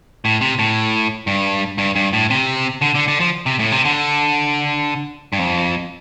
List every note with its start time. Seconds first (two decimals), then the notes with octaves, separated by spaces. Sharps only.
0.25 A2
0.41 C3
0.59 A2
1.27 G2
1.78 G2
1.96 G2
2.13 A2
2.30 C3
2.82 D3
2.95 D3
3.08 D3
3.20 F3
3.46 C3
3.59 A2
3.72 C3
3.85 D3
5.33 G2
5.39 F2